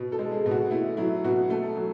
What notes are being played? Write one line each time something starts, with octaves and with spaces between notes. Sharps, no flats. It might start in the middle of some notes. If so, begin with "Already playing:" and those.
Already playing: B2
A4
G#3
G#4
B2
F#4
A3 E4
F#3 E4
B2 F#4
A3 A4
F#3